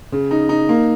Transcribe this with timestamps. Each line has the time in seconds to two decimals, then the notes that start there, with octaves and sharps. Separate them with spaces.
0.12 C#3
0.31 D#4
0.49 D#4
0.69 A#3